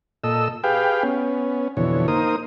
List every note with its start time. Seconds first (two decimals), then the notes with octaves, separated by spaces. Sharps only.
0.24 A#2 A4 D#5 E6
0.64 G4 G#4 B4 F5 G5
1.03 B3 C#4
1.77 F2 B2 D3 E3 C#5
2.08 A#3 D#4 A#4 C5 D#6